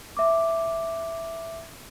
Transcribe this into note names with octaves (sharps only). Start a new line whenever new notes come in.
E5 D6